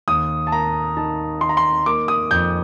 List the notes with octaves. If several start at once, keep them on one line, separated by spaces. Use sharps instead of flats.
D#2 D#6
A5
A#3 A#5
D#3 A5
D#3 C6
A#5
C6
A#3 D6
D#6
F2 G6